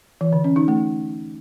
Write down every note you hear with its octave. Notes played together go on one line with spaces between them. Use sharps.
E3
D3
C#4
D#4
A3